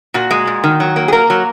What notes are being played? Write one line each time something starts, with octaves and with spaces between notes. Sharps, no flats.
A#2 F#4
G#3
A#2
D#3
F#3
A#3
G#4
A#3 A#4
F#3